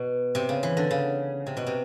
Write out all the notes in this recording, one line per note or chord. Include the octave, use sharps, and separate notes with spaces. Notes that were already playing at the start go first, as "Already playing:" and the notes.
Already playing: B2
C3
C#3
E3
D3
C#3
C3
B2
C3